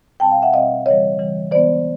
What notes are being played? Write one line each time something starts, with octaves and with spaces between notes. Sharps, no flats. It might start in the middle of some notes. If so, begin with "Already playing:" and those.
B2 G3 C4 G5 A5
F5 G5
E5 F#5
B2 G3 C4 D#5 F5
C#3 E3 G3 C#5 D#5
C#3 E3 G3
E3 G#3 B3 C5 D5